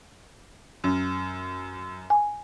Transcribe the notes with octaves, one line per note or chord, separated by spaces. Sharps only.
F#2
G#5